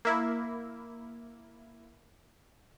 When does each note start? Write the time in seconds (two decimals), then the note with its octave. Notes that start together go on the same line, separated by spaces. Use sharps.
0.05 A#3 E4